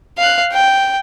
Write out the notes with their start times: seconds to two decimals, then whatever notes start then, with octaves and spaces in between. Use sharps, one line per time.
0.18 F5 F#6
0.53 G5